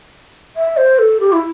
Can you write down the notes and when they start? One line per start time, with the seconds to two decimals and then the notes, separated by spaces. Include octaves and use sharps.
0.56 E5
0.77 C5
0.99 A4
1.20 G4
1.32 E4